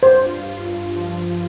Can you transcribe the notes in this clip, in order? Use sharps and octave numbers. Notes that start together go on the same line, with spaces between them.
G2 C5
F4
F4
G2
F3
F3